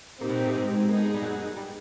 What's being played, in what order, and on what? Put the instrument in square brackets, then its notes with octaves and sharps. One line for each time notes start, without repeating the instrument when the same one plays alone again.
[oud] A#2 A#3 [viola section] C4 D#4 G4
[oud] B2 B3
A#2 A#3
A2 A3
G#2 G#3
[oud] A#3 [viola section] B3 D#4 G#4
[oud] A3
G#3
G3
F#2 F#3
G3